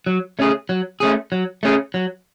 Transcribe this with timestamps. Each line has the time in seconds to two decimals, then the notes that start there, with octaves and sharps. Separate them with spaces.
0.07 F#3
0.39 A3 C#4 G#4
0.69 F#3
1.00 A3 C#4 G#4
1.32 F#3
1.63 A3 C#4 G#4
1.94 F#3